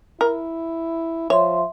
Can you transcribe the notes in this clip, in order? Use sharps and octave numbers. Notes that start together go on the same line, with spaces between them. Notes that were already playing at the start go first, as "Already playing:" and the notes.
E4 A#4
F3 C#5 E5 C6